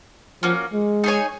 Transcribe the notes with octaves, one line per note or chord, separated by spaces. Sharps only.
F3 A#3 C#4 F#4
G#3
D#4 G#4 C#5 G#5